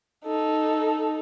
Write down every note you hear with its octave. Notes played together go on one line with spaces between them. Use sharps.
D#4 A4